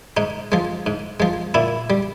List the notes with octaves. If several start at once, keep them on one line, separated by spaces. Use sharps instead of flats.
G#2 D#4
F3 G#3
G#2
F3 G#3
A#2 E4
G3